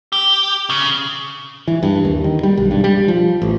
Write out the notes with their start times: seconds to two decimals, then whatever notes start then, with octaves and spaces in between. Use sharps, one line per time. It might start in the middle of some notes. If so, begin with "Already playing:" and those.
0.12 G4
0.70 C#3
1.68 E3
1.83 G2
2.05 D#2
2.24 D#3
2.43 G3
2.57 B1
2.71 G2
2.84 G3
3.08 F3
3.42 A1